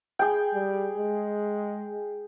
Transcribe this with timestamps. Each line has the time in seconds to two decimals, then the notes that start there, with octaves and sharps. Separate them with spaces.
0.19 G#4 G5
0.54 G3
0.98 G#3